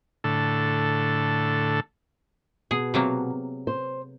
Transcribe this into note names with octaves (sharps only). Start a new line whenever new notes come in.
A2 D3 A4
B2 G#4
C3 F#3 A#3
C5